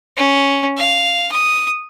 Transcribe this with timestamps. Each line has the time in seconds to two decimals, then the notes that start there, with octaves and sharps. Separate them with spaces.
0.17 C#4
0.77 F5
1.32 D#6